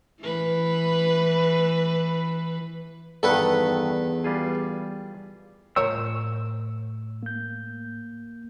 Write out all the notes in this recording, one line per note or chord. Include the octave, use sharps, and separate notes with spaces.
E3 B4
E2 G2 D#3 A4 B4 F#5
G3 F4 G#4
A2 F3 A#4 C#5 E6
A#3 G6